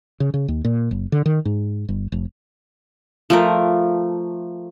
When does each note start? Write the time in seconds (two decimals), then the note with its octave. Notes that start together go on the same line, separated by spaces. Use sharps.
0.20 C#3
0.34 C#3
0.48 D#2
0.65 A#2
0.91 F#1
1.12 D3
1.26 D#3
1.45 G#2
1.89 G1
2.12 F1
3.30 F3 A3 A#4